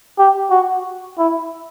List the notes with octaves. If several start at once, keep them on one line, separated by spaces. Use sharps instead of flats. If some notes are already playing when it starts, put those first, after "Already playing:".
G4
F#4
E4